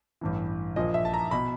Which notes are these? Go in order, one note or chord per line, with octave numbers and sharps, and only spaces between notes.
A1 G2 E3
A#1 A#2 F3 D#5
E5
A5
A#5
B2 B5